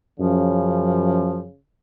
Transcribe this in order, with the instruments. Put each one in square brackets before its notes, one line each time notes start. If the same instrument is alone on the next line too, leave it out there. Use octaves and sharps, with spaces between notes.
[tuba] F#2 [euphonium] C#3 [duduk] F3